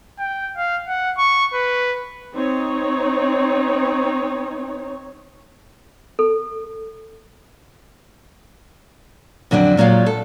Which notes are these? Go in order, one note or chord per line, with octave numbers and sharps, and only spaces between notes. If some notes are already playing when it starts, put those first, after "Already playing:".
G5
F5
F#5
C#6
B4
C4 D#4 C#5
A4
F2 D3 F#3 D4
A#2 F#3 G#3 F4
A4